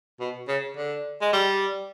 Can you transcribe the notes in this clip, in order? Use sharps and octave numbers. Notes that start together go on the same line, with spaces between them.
B2
C#3
D3
G#3
G3